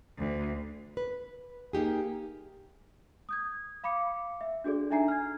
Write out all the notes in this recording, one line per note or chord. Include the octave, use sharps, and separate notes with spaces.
D2
B4
A#3 D#4 G4 G#4
D#6 G6 G#6
F5 B5 D6 C#7
E5
D4 F#4 G#4 A4 D5
D4 D#4 E5 G#5 A#5 C7
F6 G#6